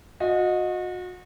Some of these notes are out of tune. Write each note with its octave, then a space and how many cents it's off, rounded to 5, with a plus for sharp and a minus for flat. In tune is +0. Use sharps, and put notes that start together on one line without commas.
F#4 -35 D#5 +0